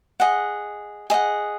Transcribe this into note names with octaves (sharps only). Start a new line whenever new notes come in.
G#4 D#5 F#5
G#4 D#5 F#5